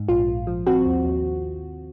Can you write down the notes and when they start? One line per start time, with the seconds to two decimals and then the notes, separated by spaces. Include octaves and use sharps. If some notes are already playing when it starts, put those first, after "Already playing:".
Already playing: G#2
0.08 A#1 F4
0.27 A#1
0.47 F3
0.67 C4 F#4
0.86 D#2
1.05 D#2